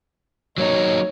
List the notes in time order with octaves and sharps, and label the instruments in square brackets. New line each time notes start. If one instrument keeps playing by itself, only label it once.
[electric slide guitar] F#3 A#3 D#4 [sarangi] C#5